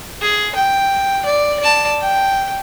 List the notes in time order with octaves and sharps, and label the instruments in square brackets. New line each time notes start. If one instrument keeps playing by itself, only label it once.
[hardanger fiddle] G#4
G5
D5
D5 A5
G5